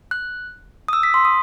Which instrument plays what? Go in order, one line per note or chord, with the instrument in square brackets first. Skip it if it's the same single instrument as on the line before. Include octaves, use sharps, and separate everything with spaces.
[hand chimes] F#6
D#6
E6
B6
C6
D#6